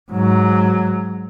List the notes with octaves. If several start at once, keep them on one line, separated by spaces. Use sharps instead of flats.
G#2 F#3